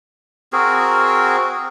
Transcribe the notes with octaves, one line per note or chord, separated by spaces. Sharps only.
C4 F#4 G#4 A#4